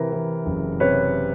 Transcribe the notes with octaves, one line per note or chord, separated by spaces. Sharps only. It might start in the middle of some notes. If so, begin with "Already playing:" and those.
Already playing: C3 E3 A#4
E3
F#1
C3 B4 C#5